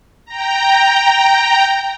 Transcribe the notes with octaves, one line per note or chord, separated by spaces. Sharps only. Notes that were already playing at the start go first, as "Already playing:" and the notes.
G5 A#5